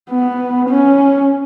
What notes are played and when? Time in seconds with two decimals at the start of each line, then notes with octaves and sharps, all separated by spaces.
0.11 B3
0.69 C#4